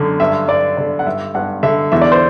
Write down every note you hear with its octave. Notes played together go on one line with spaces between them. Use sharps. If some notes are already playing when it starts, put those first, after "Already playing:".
Already playing: F#2 D3
G2 E5
G2 D5
D3 D5
F#5
G2 E5
G2 F#5
D3 E5
E2 E5
D5
C5